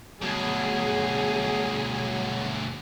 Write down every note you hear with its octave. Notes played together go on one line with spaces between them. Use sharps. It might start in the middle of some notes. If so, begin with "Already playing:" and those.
D2 B2 F#3 G#4